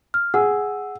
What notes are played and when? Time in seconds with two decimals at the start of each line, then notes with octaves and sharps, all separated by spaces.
0.14 F6
0.34 G#4 F#5 E6